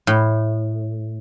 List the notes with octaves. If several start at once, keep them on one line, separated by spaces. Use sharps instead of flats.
A2